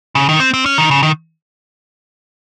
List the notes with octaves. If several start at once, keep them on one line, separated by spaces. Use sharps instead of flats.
C#3
D#3
C4
C4
C#4
D#3
C#3
D#3